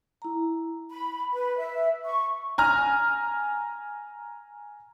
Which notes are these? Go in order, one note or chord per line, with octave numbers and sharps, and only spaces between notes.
E4 A#5
B5
B4
E5
C#6
G#5 A#5 F6